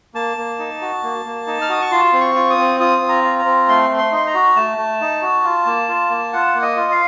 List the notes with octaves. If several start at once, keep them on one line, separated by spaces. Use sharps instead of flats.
A#3 A5
A#3
D#4
F#4
A#3
A#3
D#4
F6
F#4 D#6
C#6
F4 C6
C4
C#6
F4
D#6
C4
F4 D#6
C4
A#5
F4
A#5
C4
A3 C6
A3
C6
D#4 C6
A#5
F#4
A3 A5
A3
D#4
F#4
F4
A#3
F4
A#3
F4 F#5
A#3
D#5
F4
F5